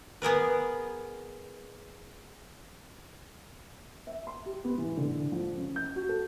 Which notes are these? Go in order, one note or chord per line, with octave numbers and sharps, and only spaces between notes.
B3 G#4 A#4 B4
E5
C6
G4
B3
E3
D3
F3
C#4
G6
F#4
A4